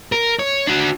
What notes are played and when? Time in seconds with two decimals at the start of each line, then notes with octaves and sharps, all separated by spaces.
0.12 A#4
0.39 C#5
0.67 D4 F#4